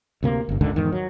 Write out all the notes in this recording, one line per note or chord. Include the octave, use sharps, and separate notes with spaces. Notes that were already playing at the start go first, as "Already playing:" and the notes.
D2 C3 A#3
G1 G2
C#2 G#2 D3 D#3
E2 G#2 D#3
F#3